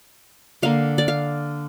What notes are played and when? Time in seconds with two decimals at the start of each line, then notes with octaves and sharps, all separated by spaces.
0.62 D3 A#3 F5
0.98 D5
1.08 F5